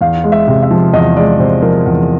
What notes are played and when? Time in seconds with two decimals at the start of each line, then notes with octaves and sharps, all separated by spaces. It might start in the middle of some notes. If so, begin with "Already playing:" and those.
0.01 E2 F5
0.24 G#3
0.32 E5
0.48 C3
0.63 E5
0.71 F3
0.93 E2 D#5
1.17 G#3 D5
1.39 C3 C5
1.62 F3 A#4
1.86 E2